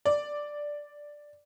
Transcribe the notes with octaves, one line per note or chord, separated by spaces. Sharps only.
D5